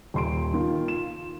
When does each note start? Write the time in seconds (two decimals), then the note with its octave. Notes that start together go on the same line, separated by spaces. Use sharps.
0.14 D#1 C6 D7
0.54 D#3 F4
0.88 E7